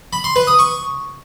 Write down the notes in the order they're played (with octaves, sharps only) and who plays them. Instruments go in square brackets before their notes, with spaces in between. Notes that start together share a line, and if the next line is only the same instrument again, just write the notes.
[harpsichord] B5
C6
B4
D#6
C#6